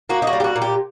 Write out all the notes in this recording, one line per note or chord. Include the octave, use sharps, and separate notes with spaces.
A#3 F#4
D#4
F#4
G3
G4
F#4
A#2
G4